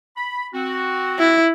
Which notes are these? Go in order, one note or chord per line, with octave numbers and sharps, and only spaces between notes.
B5
C4 F#4
E4